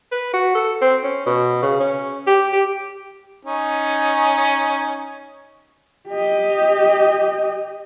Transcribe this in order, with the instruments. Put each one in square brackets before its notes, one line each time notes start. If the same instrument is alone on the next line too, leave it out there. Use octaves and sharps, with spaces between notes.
[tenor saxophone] B4
F#4
A4
C4
C#4
B2
C#3
C#4
G4
G4
[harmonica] C#4 D#4
[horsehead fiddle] G4 D#5